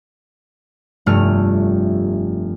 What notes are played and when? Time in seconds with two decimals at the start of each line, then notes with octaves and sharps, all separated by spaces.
1.06 F1 G2 A3 F6